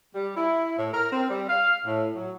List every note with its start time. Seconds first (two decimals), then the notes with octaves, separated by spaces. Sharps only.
0.15 G3
0.37 E4
0.78 A2
0.93 A#4
1.12 C4
1.30 G3
1.49 F5
1.86 A2
2.16 F#3